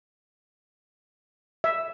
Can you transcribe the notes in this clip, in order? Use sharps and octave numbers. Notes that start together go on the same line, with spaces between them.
E5